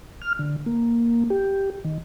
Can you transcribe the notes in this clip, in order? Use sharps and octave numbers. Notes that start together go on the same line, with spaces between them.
F6
D3
A#3
G4
D#3